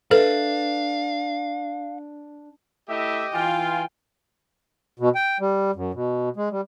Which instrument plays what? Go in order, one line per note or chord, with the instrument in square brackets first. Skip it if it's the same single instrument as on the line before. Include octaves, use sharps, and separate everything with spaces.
[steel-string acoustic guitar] D4 [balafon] A4 [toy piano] B4 E5 [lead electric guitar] F5
[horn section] A3 E4 E5 [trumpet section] G4 D#5
[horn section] E3 F4 [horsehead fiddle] G5 [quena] G#5
[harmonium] B2
G5
G3
F#2
B2
G#3
G3